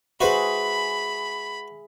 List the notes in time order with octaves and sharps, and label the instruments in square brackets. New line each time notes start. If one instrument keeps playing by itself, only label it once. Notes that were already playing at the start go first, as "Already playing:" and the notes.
[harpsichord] F#4 B4 C5 [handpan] G#4 E5 [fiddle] B5